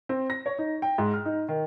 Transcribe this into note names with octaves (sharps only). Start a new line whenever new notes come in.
C4
A#6
C#5
D#4
G5
G#2
F6
D#4
D#3